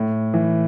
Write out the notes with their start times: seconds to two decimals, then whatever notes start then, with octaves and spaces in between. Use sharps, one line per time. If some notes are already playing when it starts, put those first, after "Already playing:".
Already playing: A2
0.34 E3